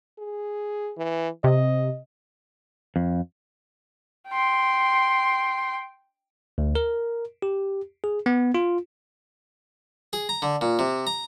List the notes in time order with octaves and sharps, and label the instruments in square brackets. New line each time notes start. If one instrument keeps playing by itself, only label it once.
[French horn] G#4
E3
[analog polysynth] C3 [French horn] D#5
[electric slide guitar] F2
[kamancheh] G5 C6
[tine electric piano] D2
A#4
G4
G#4
B3
F4
[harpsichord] G#4
A#5
D3
A#2
C3
A#5